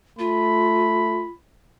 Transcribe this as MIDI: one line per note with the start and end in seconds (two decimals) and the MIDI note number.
0.19 1.26 57
0.19 1.28 65
0.19 1.36 83